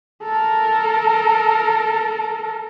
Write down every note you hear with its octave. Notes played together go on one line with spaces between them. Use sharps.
A4 A#4